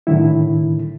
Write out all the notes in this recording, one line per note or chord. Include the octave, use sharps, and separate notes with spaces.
A2 D3 D#3 E4